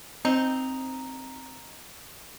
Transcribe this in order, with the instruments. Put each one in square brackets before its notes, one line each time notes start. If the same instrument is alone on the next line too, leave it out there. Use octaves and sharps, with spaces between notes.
[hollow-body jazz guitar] C4 [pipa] D#4